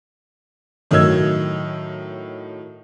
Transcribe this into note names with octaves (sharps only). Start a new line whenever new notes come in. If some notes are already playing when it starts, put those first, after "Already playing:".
A2 D#3 F#3 D#5 E6 G#6